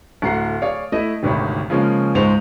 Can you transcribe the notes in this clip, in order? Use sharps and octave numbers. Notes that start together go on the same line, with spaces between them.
D1 A3 F#5 A#5 C7
G#4 C#5 D5 F5
A3 E4 D#5
G#1 D2 C3 D#3 C#5 B5
C#3 F3 G#3 A#3 C#4
C#2 G#2 G#3 C5 C#6 F7